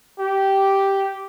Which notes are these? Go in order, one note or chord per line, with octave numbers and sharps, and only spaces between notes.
G4